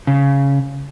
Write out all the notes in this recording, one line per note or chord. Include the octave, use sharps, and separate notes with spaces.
C#3